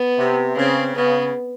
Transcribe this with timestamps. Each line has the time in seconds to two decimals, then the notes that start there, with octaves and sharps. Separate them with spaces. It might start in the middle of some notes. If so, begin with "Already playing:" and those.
Already playing: B3
0.18 C3
0.57 C#3 C4
0.95 C#3 B3